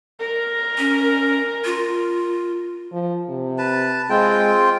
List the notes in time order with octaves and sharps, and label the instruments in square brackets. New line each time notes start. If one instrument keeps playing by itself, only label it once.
[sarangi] A#4
[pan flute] C#4
F4
[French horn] F3
C3
[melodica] B4 A5
[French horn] G#3 [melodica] C4 F4 G5